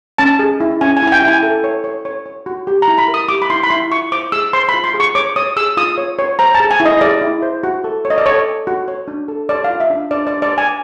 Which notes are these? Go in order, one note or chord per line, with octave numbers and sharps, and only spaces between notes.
C#4 A5
G#4
E4
C#4 G#5
G#5
E4
G#5
G5
E4
G#5
A4
C#5
C#5
C#5
C#5
F#4
G4
A#5
E4
B5
A#4
D#6
G4 D6
B5
E4 C6
B5
E4 C6
F4 C#6
C5 D6
G#4 E6
C5 C6
B5
F4
C6
G#4
C#6
C#5 D6
C#5 D#6
G#4 E6
F4 D#6
C#5
C#5
C5 A#5
A5
G#4
G#5
E4
D#5
G#4 D5
E4
C5
F#4
A4
C#5
D#5
D5
A4 C#5
C#5
F#4
C#5
D4
A4
C#5 D5
F5
F4
E5
D4
D4 D5
D5
D4
D5
B4 G#5